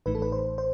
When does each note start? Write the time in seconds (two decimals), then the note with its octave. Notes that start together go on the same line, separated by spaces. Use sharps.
0.06 A1 A2 E3 A3 D#4 B4
0.15 A4
0.22 B4
0.32 C5
0.58 C5